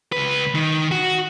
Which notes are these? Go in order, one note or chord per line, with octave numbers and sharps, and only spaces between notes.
C#2 B4
D#3
F#4